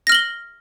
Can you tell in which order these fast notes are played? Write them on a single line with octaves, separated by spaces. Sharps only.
A#6 F6 F#7 G7